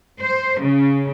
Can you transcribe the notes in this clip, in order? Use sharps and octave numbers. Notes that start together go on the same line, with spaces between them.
C5
C#3